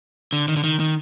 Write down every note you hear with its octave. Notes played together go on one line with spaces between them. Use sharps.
D3
D#3
D3
D#3
D#3